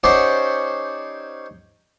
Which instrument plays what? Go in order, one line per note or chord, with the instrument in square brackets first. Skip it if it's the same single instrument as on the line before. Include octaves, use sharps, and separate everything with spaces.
[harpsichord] C#4 D#4 G4 C5 D5 F#5